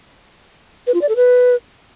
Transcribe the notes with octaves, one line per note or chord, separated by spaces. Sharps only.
B4
F4
D5
A4
B4